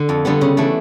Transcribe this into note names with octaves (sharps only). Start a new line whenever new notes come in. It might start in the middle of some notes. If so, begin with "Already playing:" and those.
Already playing: D3
F2
D3 G3 B3
C#3
E3 A3 D4